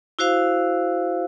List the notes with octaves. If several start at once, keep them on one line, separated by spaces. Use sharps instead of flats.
E4 F#4 C5 F5